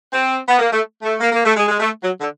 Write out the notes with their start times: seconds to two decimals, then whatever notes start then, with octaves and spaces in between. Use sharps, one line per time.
0.12 C4
0.47 B3
0.59 A#3
0.71 A3
1.02 A3
1.20 A#3
1.32 A#3
1.44 A3
1.56 G#3
1.68 G#3
1.80 A3
2.02 F#3
2.20 D3